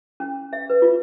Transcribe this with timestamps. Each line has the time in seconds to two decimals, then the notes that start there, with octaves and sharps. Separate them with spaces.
0.20 C#4
0.53 E5
0.70 B4
0.82 F4